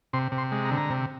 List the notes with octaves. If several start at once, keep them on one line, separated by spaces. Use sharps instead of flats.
C3 C6
C3
C6
G#3
A#5
D3
A#5
C3